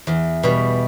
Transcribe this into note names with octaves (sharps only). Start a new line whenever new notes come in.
E2
B2 G3